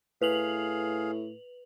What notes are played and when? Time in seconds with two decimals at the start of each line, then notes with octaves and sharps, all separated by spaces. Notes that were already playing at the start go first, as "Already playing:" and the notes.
0.21 A2 G#4 B4 F5 F7 F#7